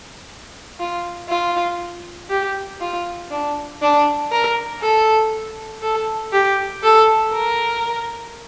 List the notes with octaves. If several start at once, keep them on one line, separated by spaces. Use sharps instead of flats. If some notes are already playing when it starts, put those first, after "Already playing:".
F4
F4
G4
F4
D4
D4
A#4
A4
A4
G4
A4
A#4